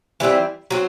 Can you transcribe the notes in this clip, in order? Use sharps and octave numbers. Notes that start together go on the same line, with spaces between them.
E3 G3 C4 E4
F#3 C4